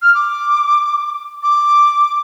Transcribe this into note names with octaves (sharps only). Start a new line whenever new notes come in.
F6
D6
D6